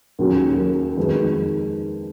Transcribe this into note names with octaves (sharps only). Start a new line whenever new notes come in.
D#2 C#3 F#3 C#4
A#4
F2 D#3 G#3 D#4 B4